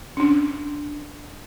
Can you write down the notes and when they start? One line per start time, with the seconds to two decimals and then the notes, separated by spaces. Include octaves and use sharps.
0.17 C#4 D4